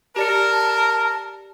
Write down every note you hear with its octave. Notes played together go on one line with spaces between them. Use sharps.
G4 A#4 D5 A5 C#7